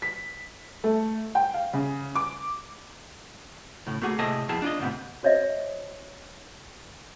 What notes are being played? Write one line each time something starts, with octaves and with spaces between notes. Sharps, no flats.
B6
A3
G5
F5
C#3
D6
A2 C#3
A3 A#3 F#4 G#4
A2 C3 A3 G#4 D#5 A5
F2 B3 E4 F4 G#4 A5
D4 F4 D#5
D2 G#2 C3 B3
F#4 C5 C#5 D#5 E5